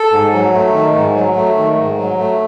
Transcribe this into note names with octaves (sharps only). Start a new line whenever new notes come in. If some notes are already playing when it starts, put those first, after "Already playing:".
Already playing: A4
G#2
F#3
A3
D#3
G#2
F#3
A3
D#3
G#2
F#3
A3